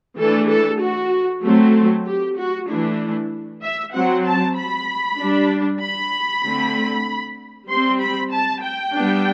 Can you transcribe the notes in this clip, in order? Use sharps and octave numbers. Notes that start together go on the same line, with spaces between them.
E3 A3 D4 A4
A4
F#4
F#3 A3 C4
G4
F#4
E3 A3 D4 E4
E5
F#3 C4 F#5
A5
B5
G3 D4
B5
D3 A3 C4
G3 C4 C6
B5
A5
G5
G3 B3 D4